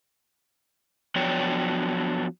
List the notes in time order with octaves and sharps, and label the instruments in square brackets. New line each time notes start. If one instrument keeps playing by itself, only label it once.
[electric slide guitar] F3 F#3 B3 D4 C#5 G5